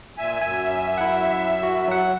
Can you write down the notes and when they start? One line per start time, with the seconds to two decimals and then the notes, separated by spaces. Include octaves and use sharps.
0.18 A#2 E5 G#5
0.41 F#2 E5 G#5
0.98 E4 F#5
1.63 F#4
1.88 F#3 F#5